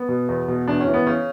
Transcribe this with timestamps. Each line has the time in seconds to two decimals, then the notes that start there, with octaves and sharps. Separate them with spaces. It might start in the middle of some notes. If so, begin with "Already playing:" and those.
Already playing: B3
0.09 B2
0.29 E2
0.48 B2
0.68 E2 D4
0.81 C#4
0.87 E3
0.94 B3
1.07 C#3 C#4